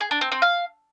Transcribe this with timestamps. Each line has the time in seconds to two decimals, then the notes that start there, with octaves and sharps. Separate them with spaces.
0.01 G#4
0.11 D4
0.21 C4
0.32 C4
0.42 F5